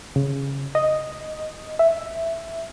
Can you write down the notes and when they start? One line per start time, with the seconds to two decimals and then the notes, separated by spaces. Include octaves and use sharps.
0.16 C#3
0.75 D#5
1.79 E5